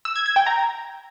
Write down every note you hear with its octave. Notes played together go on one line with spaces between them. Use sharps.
E6
G#6
G#6
G5
A#5